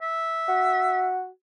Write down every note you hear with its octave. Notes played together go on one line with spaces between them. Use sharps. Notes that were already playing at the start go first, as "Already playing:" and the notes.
E5
F#4